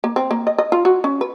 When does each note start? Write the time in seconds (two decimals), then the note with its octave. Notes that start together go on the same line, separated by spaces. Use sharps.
0.04 A#3
0.16 C4
0.31 A#3
0.47 D#5
0.58 D#5
0.72 F4
0.85 F#4
1.04 C#4
1.21 B4